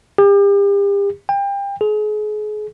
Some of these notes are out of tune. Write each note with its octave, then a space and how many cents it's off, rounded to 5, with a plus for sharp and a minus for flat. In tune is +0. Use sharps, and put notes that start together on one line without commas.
G4 +40
G5 +30
G#4 +35